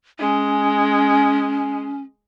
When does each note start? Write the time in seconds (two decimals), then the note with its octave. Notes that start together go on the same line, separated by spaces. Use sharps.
0.19 G#3 C#4